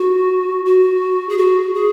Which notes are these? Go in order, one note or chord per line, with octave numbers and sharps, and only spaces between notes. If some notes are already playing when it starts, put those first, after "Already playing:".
Already playing: F#4
F#4
G#4
F#4
G#4